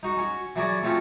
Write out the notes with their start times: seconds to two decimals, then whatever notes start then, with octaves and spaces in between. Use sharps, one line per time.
0.03 D#4 F#4
0.17 C#4 F#4
0.56 E3 F#3 F#4 G#4 D5
0.83 F3 A3 C4 C#4 F4 F#4